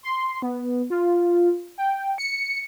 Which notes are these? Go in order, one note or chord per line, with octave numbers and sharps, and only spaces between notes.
C6
B3
F4
G5
C#7